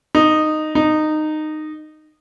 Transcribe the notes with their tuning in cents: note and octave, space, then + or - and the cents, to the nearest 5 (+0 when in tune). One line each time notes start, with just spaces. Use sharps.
D#4 -10
D#4 -15